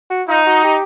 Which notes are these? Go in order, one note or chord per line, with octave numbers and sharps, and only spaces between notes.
F#4
D#4 F4
F#4
G4